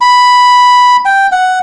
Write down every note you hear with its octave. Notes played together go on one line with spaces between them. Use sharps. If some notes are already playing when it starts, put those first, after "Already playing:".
B5
G5
F#5